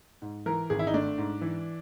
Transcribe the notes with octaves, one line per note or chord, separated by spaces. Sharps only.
G#2
E3 A#4
G#1 G#4
E4
D#4
A3 D4
G#2
E3